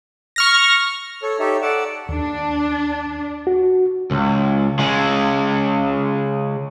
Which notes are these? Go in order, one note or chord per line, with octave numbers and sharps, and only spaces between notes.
C#6 F6 A#6
A4 C#5
D#4 G4 A4 C#5 E5
A4 D5 F#5 A5
D#2 D4
F#4
C#2
C#3 G#3